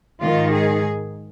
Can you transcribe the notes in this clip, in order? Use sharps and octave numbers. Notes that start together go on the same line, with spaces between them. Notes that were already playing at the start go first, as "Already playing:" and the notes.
G#2 D#3 F4
G#4